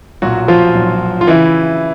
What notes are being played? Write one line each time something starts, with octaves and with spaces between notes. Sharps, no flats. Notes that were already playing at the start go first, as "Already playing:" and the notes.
B1 A#2 F#3 F#4
F3 F4
B1 A#2
F4
C#3 E3 E4